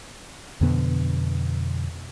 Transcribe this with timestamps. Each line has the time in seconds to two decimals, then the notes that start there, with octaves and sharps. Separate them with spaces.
0.61 F2 B2 D3 B3